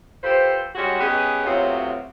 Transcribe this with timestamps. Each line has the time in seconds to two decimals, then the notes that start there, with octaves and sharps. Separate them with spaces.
0.23 F4 G4 A4 B4 C5
0.75 G3 G#3 C#4 F#4
1.00 B3 C#4 D#4 G4 G#4 B4
1.45 C3 F#3 A3 B3 F4 C#5